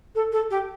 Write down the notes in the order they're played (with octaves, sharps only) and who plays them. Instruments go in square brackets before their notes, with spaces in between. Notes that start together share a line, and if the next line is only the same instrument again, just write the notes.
[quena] A4
A4
G4